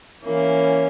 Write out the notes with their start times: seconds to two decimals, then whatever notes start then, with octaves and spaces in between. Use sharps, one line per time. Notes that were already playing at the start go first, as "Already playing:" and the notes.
0.23 E3 A#3 C#4